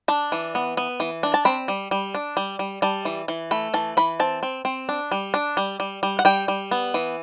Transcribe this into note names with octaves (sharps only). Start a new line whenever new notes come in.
D4 A5
E3
B3
B3
E3
D4
A5
C4 B5
G3
G3
D4
G3
G3
G3 A5
E3
E3
A3 B5
E3 A5
E3 B5
C4 A5
C4
C4
D4
G3
D4
G3
G3
G3
F#5
G3 G5
G3
B3
E3